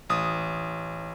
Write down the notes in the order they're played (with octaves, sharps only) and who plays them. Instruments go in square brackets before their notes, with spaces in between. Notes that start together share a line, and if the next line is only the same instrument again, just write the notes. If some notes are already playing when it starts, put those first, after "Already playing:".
[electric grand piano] A1 D#6